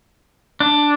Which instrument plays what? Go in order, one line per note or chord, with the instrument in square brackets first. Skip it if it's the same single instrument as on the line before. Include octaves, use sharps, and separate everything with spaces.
[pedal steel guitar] D4